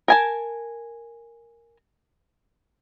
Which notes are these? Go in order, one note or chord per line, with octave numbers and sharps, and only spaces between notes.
A#4 G#5 A5